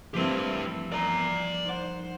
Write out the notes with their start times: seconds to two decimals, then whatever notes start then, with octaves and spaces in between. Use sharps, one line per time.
0.14 F3 G3 A3 A#3 C4 E4 G4 B4
0.45 E3
0.92 A#4 D5 A#5
1.65 D#4 C5 F#5